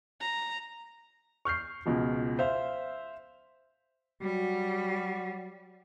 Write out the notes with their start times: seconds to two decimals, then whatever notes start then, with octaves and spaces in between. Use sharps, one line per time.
0.21 A#5
1.45 C#6 F6 G6 C7
1.86 C#2 B2 F3
2.39 C5 E5 F5
4.21 F#3 G3 F#4